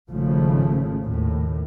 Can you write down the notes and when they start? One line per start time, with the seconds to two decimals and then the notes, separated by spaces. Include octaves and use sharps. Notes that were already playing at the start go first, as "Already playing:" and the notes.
0.11 G#1 C#3 F3 A3
1.04 D#2 A2